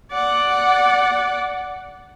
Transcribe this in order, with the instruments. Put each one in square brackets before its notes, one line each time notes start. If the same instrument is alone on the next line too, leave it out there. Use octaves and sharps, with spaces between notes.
[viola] D5 F#5